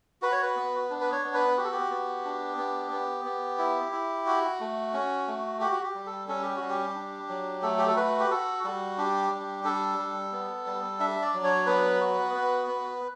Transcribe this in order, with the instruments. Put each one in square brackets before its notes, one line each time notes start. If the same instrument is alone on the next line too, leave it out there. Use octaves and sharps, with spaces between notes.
[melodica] F#4 B4
C#5
B4
B3
D4
B4
C#5
B3
B4
F#4 G4
A4
G4
B3
D4
B3
B3
B3
E4
E4
F#4
A3
C#4
A3
F#4 G4
F#4
G4
G3
A4
C#4 A4
G4
F#4
G3
G4
D4
F#3
A3 A4
G4
A4
F#4 B4
G4
F#4 A4
G3 F#4
D4 G4
G3
D4 A4
G3
B3
G3
D4 E5
D5
F#3
C#5
B3 B4
F#4
B3
B3